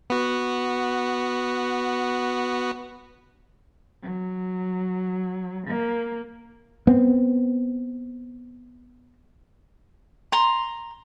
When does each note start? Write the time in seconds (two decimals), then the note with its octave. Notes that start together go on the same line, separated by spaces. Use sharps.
0.10 B3 F#4
4.02 F#3
5.67 A#3
6.87 B3 C4
10.32 A#5 C6